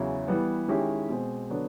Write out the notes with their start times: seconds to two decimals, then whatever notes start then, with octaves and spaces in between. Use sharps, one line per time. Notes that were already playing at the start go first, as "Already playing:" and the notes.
Already playing: E2 C#3 F#3 E4
0.28 E3 G3 B3
0.68 D#3 G#3 C#4 E4 G4
1.09 B2 G#3 C4
1.50 D3 F#3 B3 D4